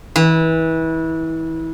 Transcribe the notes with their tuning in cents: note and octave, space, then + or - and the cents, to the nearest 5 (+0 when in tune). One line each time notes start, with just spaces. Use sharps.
E3 -25